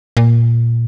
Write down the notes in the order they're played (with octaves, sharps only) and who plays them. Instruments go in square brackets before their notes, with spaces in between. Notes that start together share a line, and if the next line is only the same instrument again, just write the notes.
[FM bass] A#2